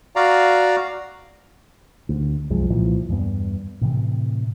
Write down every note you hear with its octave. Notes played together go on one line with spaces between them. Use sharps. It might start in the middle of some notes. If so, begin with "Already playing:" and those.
F#4 D5 F5 A#5
D2
C2 F#2 F3 G#3
C2 A#2 E3 F3
E2 G2 B3
A2 C3 E3